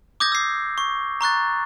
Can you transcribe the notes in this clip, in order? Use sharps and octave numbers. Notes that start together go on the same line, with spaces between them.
D6 D#6 G6 G#6 A#6
E6 C7
C#6
A#5 C#6 F#6 A6